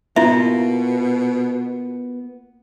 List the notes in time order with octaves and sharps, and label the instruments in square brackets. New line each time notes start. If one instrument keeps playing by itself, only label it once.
[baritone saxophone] B2 [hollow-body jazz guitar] A#3 B3 F4 [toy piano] E4 E5